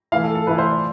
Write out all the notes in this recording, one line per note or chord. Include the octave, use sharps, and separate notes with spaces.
E3 A3 E4 F5
A4
A4
E3 A3 E4 B4
C5
D5